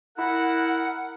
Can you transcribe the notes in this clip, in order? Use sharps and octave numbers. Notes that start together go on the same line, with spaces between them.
E4 A#4 F#5